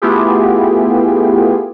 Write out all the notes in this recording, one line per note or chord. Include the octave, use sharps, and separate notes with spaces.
A3 B3 E4 F4 G4 G#4